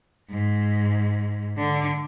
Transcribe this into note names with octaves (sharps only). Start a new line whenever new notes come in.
G#2
D3